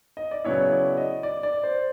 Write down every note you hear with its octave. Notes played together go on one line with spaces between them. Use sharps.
D#5
D5
C#3 F#3 B3 E4 C#5
D5
D#5
D5
D5
C5